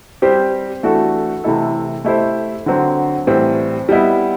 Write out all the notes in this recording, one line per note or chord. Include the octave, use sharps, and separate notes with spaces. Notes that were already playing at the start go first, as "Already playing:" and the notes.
G3 C4 G4 C5
E3 A3 D4 F#4 A4
C3 E3 A3 E4 A4
A3 E4 G4 C5
D3 F#3 C4
A2 E3 G3 C4
G3 B3 E4